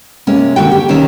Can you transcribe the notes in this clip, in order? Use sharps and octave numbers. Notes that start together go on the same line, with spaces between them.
C3 G#3 A#3 C#4
D#2 D3 F#4 G5
G4
C3 D#3 C#4 E5